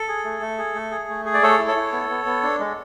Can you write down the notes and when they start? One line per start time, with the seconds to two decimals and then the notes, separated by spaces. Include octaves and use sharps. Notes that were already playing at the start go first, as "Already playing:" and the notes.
Already playing: A4
0.08 G#4
0.25 A3
0.42 A3
0.58 G#4
0.75 A3
0.91 G#4
1.09 A3
1.25 G#4
1.34 D5
1.43 A3 A4 C#5
1.59 E4
1.67 A4 C#5
1.76 E4
1.92 B3
2.10 B3
2.26 B3
2.43 D4
2.59 G#3